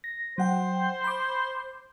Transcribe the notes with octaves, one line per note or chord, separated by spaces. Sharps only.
A#6
F#3 C5 F#5 G5
B5 D6